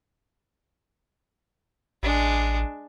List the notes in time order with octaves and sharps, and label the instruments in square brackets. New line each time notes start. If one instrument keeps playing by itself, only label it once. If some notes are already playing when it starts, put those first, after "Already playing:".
[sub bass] A1 [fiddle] G#3 D4